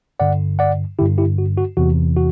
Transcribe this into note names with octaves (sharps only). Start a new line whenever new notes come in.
G2 D3 D5 F#5
D5 F#5
G2 D3 E4 G4
E4 G4
F#4
F#4
E2 C3 E3 F#4
F#4